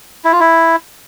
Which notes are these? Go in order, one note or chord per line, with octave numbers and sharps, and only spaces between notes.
E4
F4
E4